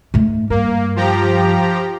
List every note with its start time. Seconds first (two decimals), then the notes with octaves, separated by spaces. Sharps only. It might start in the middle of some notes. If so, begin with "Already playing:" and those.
0.14 G#2 A3
0.50 G2 A#3
0.96 F3 G4 A#5